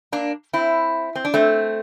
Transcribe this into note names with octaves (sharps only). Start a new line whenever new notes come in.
A#3 D4
C4 E4
C4
D4
A3 C4